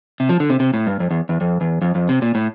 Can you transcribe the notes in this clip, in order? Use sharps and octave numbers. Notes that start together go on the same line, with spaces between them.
C3
F3
D3
C3
C3
A2
G2
F2
E2
E2
F2
E2
F2
F2
C3
A#2
A2